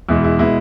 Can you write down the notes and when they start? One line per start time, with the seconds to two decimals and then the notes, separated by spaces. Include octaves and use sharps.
0.08 E2 B2 G#3 E4
0.24 E4
0.39 B2 G#3 E4